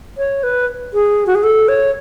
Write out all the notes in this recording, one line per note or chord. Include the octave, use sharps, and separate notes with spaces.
C#5
B4
G#4
F#4
G#4
A4
C#5